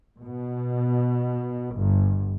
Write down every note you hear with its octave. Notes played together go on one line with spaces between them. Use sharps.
B2
G1